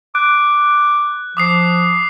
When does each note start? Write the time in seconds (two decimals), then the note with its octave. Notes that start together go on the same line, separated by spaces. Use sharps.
0.15 D6 F#6
1.37 F3 D6 D#6 C7